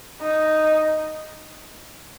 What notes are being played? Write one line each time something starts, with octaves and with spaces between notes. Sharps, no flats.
D#4